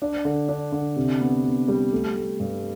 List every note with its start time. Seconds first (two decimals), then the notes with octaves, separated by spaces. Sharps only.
0.02 D4
0.25 D3
0.49 D4
0.72 D3
0.96 C3
1.21 B3
1.45 B3
1.68 G3
1.93 A3
2.16 A3
2.40 G2